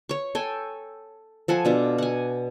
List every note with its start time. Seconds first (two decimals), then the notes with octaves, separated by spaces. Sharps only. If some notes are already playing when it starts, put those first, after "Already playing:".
0.09 C#5 C#6
0.35 A4 G5 G#5
1.48 F3 A4 F#5 G#5
1.65 B2 D4 F4
1.98 F#5 G#5